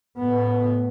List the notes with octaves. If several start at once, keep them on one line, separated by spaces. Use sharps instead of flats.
A2 B3